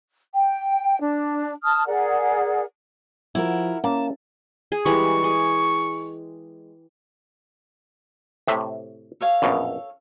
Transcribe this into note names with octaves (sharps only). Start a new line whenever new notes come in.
G5
D4
A5 D#6 F6
G#4 A#4 D5 F#5
F3 E4 F#4 A#4
A#3 C#4 A5
G#4
E3 G3 G#3 C#6
G#4
A2 C3 E5
A4 C#5 F5
A#1 F#2 B2